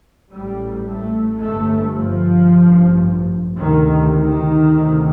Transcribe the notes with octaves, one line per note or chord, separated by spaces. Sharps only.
A1 A2 G3
A3
G1 G2 A3
F3
A1 G2
D2 C3 D#3
D#3
D2 C3